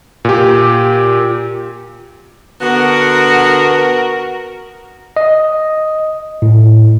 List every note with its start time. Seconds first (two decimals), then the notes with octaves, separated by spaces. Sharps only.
0.25 A#2 G4
2.61 D3 B3 F#4 A#4
5.17 D#5
6.42 A2